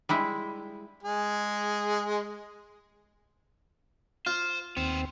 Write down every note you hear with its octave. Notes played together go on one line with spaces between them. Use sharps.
G3 G#3 E4
G#3 G#4
F4 C5
D#2 B3 C4 C5